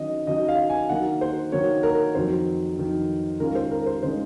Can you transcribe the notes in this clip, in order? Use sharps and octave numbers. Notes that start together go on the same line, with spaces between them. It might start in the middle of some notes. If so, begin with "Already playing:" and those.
Already playing: D#3 F#3 C#4 D#5
D#3 F#3 C#4 D#5
F5
G#5
D#3 F#3 A#3 F#5
C5
D#3 F#3 A#3 C#5
A#4
F2 D#3 F#3 C5
F2 D#3 F#3
D#3 G#3 C#4 F4 A#4
C5
A#4
C5
D#3 G#3 C#4 F4 C5